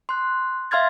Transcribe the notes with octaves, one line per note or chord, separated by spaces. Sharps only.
C6 F#6
E5 F5 C6 F6 G#6 A6